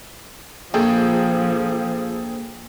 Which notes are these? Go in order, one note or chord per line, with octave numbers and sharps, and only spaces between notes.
A#1 F3 G#4 A4 G5